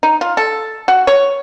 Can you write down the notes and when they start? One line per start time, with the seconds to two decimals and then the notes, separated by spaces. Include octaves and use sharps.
0.03 D#4
0.21 F4
0.37 A4
0.88 F#4
1.07 C#5